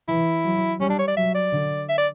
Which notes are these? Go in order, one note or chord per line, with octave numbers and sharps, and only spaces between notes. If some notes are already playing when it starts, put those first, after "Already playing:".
E3 E4
F#3
G3 C#4
D4
C#5
D5
F#3 E5
D5
D3
E5
D5